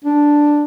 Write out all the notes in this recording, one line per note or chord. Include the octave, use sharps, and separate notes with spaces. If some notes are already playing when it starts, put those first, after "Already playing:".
D4